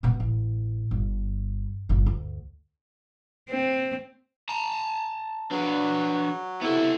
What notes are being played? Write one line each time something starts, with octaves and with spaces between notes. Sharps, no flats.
B2 B3
A1
G1
G1 C#3
D2
C4
A5 A#5
F#3 D4 G#4 B4
C3 B3 E4 A4